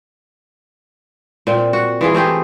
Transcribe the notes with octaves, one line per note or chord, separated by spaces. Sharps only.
A#2 C4
F#4
E3 F4 G#4
A3 C4 G4 G#4